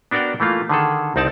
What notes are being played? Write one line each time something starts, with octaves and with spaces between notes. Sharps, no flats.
B3 D4 F#4 A#4 D5 G5
E3 A3 A#3 F4
D3 D#3 G#4 A4
C2 C4 D#4 D5 A5